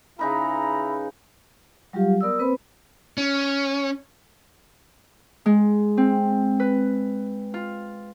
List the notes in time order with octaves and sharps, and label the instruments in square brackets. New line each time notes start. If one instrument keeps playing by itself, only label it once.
[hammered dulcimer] C#3 D#4 B4 [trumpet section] E4 A#5 B5
[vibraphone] F#3 G3 F4 G4 F5
B3 A#4 D5 D#6 E6
A#3 C4 B4 C5 B5
[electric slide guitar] C#4
[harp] G#3
C4
B4
F4